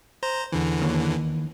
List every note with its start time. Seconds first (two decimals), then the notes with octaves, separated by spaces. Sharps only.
0.23 C5 A#5
0.52 E2 D3 E3
0.82 D#2